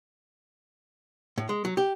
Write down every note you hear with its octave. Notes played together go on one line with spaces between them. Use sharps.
A2
G#3
F#3
G4